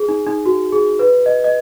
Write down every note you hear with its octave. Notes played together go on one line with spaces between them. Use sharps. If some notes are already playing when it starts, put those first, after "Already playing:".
Already playing: G#4
D#4
D#4
F#4
G#4
B4
D#5
D#5